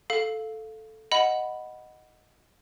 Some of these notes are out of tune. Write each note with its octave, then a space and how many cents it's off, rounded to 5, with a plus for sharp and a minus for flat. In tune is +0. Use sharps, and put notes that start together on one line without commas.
A4 +0 F5 +0
D#5 +0 F#5 +0 B5 +0